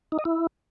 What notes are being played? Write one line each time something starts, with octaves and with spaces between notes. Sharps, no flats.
D#4
D#5
E4